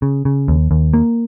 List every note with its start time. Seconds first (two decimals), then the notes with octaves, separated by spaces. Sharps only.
0.02 C#3
0.25 C#3
0.48 D#2
0.71 D#2
0.93 A#3